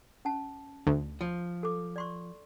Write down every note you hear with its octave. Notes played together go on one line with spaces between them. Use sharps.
C#4 A5
D2
F3
A4 D6
D5 C6 C#6